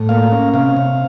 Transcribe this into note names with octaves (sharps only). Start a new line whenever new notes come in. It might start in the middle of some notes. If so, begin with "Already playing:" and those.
Already playing: A2
A#3 F5
C#4
C3 F5
C3